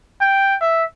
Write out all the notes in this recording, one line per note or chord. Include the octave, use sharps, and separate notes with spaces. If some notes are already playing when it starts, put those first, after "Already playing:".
G5
E5